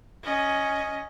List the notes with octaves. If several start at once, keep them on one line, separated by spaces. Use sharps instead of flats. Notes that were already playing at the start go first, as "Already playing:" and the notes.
C#4 D#5